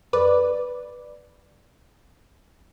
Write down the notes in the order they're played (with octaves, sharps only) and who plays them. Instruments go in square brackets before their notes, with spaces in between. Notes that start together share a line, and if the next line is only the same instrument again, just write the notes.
[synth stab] F2 B4 D5